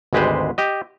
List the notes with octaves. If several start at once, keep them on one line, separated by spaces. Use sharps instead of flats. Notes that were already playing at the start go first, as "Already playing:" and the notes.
G#1 D2 G#3 G4 B4 C5
G4 D#5